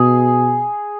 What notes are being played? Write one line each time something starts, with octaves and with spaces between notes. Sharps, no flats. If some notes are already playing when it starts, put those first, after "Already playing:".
Already playing: B2 G#4